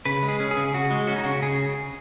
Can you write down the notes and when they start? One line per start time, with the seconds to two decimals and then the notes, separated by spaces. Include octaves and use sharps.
0.05 C#3 B4
0.23 G#3
0.28 G#4
0.40 C#4
0.51 G#4
0.57 C#3
0.74 C#3 F#4
0.91 G#3
1.07 C#4 F#4
1.16 D#4
1.24 C#3 F#4
1.42 C#3 G#4